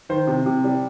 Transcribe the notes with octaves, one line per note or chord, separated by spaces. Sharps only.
D#3 C5
C3
C3
G3